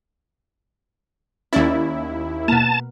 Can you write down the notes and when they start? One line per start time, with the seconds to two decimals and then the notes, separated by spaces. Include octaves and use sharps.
1.53 D#2 C#4 E4 D5
2.48 B2 A#3 A5